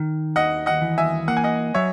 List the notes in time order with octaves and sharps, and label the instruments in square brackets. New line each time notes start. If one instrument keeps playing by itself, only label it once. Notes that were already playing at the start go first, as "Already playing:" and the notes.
Already playing: [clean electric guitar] D#3
[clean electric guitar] D#2 [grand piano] D#5 F#5
[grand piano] D#5 F#5
[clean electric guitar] E3
[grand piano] E5 G#5
[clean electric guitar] A#3 [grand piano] F#5
[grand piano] G#5
D#5 F#5
[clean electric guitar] F#3 [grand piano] C#5 E5